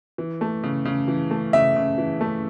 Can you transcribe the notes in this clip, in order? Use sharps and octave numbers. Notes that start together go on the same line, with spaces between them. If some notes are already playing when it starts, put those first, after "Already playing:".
E3
A3
C#3
C#3
E3
A3
C#3 E5
C#3
E3
A3